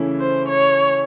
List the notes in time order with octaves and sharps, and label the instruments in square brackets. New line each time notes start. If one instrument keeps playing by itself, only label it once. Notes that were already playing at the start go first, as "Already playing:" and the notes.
Already playing: [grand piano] C#3 E3 A3 C#4 E4
[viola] C5
C#5